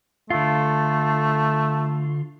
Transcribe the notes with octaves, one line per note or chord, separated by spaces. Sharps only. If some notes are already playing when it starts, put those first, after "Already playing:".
D3 A3 F4